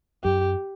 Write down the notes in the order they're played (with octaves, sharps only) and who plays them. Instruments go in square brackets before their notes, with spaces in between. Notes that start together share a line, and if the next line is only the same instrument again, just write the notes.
[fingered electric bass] F#2 [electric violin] G4